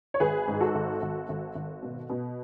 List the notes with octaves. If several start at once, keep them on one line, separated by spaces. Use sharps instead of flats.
C#5
G#1 G#4 B4
G#2
F#4 A4
G#1
G#1
G#1
G#1
B2
B2